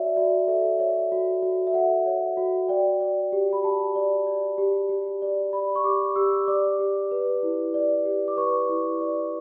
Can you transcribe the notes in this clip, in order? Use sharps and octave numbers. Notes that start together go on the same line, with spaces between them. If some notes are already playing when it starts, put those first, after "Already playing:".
Already playing: F#4 A4 C#5 D5 E5
F#4 D5
A4 E5
C#5 E5
F#4
F#4
E5
A4 F#5
C#5
F#4
D5 G5
D5
G4
B5
G4 A5
D5
D5
G4
G4
D5
D5 B5
C#6
G4 D6
G4 E6
D5 D6
G4
B4
E4
D5
G4
D6
B4 C#6
E4
D5